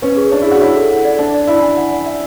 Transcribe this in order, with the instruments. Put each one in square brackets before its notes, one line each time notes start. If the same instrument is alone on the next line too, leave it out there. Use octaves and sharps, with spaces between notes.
[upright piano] C#4 [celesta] B4
[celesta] G#4
[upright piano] D4 [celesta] C#5
[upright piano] E4
[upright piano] F#4 [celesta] G#4
[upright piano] E4 [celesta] C#5
[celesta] A4
F#5
D5
[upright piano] D4 [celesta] A5
[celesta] D5
[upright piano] E4 [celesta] B5
[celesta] G#5
F#5
D5
E5